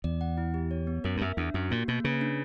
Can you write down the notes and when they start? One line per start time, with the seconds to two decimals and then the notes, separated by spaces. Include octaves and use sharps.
0.04 E2 D5
0.21 F#5
0.38 E4
0.54 G4
0.71 C#5
0.87 B3
1.04 F#2 A#4
1.17 G2
1.21 F#2 E5
1.37 E2 D4
1.54 F#2 F#4
1.71 A#2 A#3
1.88 B2 A#3
2.04 C#3 B4
2.21 D4